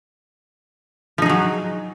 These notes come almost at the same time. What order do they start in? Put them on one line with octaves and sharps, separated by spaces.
F3 D#4 G#4 F#3